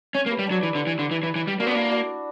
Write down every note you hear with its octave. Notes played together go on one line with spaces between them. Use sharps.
C#4 C#5 E5
A#3
G4 B4
G3
F#3 D4
E3 E4
D3
E3
D3
E3
E3
E3
G3
A#3 D4 F#4
B3
A#3 D4 E4
D4 F#4